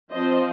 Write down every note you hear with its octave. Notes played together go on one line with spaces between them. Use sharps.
F3 C4 C5 D#5